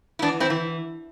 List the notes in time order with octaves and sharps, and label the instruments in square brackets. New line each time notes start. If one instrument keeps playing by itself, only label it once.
[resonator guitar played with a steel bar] E4
E3 B3 D4
C4 E4
E3